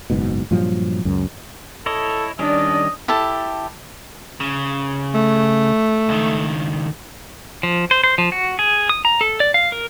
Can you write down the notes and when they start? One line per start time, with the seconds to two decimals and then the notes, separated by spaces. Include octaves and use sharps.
0.10 F#1 G#2 B2
0.51 G2 A#2 F3 F#3
1.05 C#2 F#2
1.86 E4 A4 C#5 D#5
2.39 D#3 G3 C#4 D4 D5 D#5
3.08 E4 G4 A4 A5
4.40 C#3
5.14 A3
6.09 C#2 D#3
7.63 F3
7.91 C5
8.04 C5
8.18 F3
8.32 F#4
8.59 G#4
8.89 D#6
9.05 A#5
9.21 A4
9.40 D5
9.54 F5
9.72 A#4